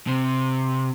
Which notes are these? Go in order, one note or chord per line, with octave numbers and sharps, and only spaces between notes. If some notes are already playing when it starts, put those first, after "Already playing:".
C3